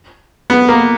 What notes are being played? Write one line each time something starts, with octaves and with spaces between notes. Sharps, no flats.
B3
A#3